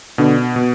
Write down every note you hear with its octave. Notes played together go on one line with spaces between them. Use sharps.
B2 D3
B2